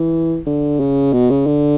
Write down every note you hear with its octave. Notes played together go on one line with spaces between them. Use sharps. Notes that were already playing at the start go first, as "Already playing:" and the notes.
Already playing: E3
D3
C#3
B2
C#3
D3